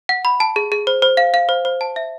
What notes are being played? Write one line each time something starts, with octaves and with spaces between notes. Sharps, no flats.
F#5
B5
A5
G#4
G#4
C5
C5
F5
F5
C5
C5
A5
E5